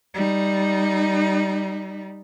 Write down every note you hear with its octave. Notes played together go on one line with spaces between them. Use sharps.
G3 D#4